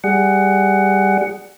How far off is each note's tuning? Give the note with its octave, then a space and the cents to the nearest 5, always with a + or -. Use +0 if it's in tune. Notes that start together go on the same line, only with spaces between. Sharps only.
G3 +0 G#4 -5 F#5 +15